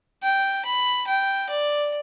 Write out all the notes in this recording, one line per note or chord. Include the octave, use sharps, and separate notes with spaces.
G5
B5
G5
D5